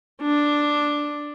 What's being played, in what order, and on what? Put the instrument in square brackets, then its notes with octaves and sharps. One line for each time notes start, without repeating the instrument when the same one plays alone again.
[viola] D4